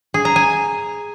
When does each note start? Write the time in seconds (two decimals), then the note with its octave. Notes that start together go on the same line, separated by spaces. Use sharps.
0.14 G#4
0.25 A#5
0.36 G#5